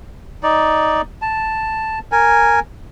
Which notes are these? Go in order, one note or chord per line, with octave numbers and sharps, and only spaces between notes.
D#4 D5
A5
A#4 G#5